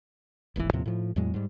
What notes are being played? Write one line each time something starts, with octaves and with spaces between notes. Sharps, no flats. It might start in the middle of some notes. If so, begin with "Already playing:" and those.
D1 G#1 D#2 E3
D#2 A2 C3 F3
A2 F3
E2 A2 F#3 G#3
G#2 G3